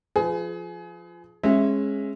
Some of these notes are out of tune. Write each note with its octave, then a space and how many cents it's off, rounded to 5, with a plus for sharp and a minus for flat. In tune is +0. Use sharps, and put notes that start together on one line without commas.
F3 +0 G#4 +25 B4 +40
G#3 +0 C#4 -25 E5 +0